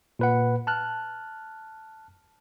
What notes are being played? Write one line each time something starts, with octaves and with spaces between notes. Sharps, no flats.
A#2 B4 F#5
A5 F6 F#6